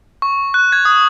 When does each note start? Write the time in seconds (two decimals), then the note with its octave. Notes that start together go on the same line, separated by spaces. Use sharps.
0.22 C#6
0.54 F#6
0.72 G#6
0.85 D#6